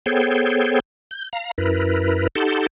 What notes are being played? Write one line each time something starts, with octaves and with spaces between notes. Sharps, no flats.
B3 G#4 A4 C5 C#5 G5
G6
F5 A#5
F#2 E4 A#4 B4
D#4 G4 A4 F#5 A5 C6